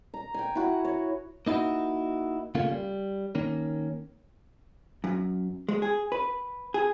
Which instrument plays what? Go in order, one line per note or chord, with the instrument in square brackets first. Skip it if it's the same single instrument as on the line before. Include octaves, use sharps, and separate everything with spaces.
[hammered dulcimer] A#5
G5 G#5
E4 F#4
C#5
[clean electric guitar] A#3 D#4 E4 F#4
C#3 A3 A#3 F4
G3
D#3 A#3 C#4
[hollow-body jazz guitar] F#2
G#3
G#4
B4
G#4